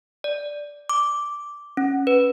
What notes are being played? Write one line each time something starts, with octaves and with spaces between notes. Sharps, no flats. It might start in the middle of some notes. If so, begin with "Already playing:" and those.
D5
D6
C#4
B4